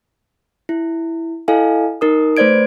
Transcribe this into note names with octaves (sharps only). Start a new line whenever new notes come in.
E4
E4 A4 D#5 F5 G#5
D#4 A#4 D#6
A3 B4 C5 D5 G#6 D7